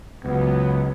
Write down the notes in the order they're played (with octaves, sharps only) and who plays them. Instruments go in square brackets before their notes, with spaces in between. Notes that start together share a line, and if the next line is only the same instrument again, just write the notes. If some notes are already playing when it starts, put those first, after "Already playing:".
[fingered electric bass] C#2 [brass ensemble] F#3 B3